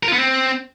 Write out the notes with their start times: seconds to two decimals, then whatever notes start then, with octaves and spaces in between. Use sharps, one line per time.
0.03 A#4
0.08 F4
0.13 B3
0.18 C4